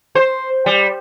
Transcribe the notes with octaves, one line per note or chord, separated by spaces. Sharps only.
C5
G3